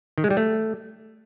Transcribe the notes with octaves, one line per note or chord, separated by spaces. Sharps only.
D#3
G#3
G3
A3